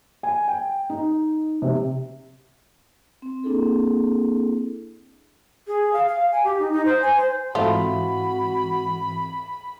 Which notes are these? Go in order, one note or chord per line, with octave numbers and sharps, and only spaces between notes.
G#5
G5
D#4
C3
C4
A#3 C4 D4 E4 G#4 A4
G#4
F5
F5
G#5
G4
D#4
D#4
C5
G#5
C5
G#2 E3 A3 C4 F4 F#4 B5